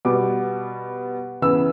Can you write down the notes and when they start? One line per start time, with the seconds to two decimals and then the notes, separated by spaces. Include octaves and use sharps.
0.05 B2 G3 B3 D6
1.42 C#3 E3 B3 E6